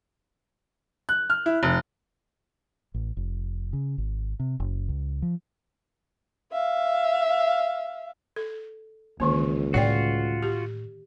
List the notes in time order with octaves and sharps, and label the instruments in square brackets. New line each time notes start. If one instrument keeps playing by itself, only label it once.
[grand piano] F#6
F6
E4
F1
[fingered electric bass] A1
F1
C#3
G#1
C3
F#1
C#2
F3
[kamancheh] E5 F5
[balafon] A4
[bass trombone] C#2 [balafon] D3 D#3 A#3 [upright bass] D4
[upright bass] A2 [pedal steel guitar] F4 F#4 [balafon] C#5 D5 G5
[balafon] G4